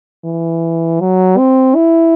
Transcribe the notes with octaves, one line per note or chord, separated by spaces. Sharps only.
E3
F#3
C4
E4